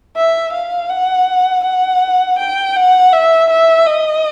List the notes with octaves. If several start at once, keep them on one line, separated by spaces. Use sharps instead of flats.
E5
F5
F#5
F#5
G5
F#5
E5
E5
D#5